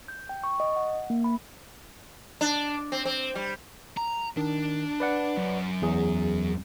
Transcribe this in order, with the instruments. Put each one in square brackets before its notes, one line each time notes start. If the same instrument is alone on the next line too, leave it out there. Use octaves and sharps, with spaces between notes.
[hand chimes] G6
G5
C#6
D#5
F#5
A#3
B5
[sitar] D4
C4
C4
G3
[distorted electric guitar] A#5
[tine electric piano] D#3 [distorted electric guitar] D4
[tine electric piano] B4 D5 F#5
[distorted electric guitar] F#2
[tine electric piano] E2 G#4